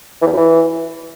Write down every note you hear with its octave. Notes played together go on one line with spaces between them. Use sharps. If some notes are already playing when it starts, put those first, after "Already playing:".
E3
E2
F#2
E3